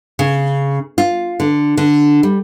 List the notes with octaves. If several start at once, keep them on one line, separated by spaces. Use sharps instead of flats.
C#3
F4
D3
D3
G3